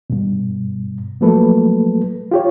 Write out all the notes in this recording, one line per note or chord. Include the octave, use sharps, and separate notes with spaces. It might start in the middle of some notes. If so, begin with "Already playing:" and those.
G2 B2
F3 F#3 A3 A#3 A4 B4
F4 G4 C#5